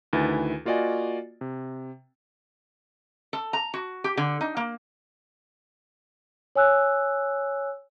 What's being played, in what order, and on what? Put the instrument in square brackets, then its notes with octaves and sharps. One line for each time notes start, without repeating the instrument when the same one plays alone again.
[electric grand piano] D2 D#3 E4 B4 G#5 A6
A#3 F4 F#4 D5 D#5 G#5
C3
[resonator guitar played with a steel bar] A4
A#5
F#4
G4
D3
D#4
A#3
[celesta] C#5 G#5 E6 F#6